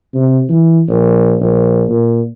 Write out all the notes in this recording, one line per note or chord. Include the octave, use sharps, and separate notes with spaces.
C3
E3
A#1
A#1
A#2